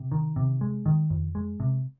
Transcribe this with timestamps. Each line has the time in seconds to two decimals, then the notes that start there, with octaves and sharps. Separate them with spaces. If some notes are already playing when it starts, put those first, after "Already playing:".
Already playing: C3
0.12 D#3
0.36 C3
0.61 G#3
0.86 D#3
1.10 F2
1.35 G#3
1.60 C3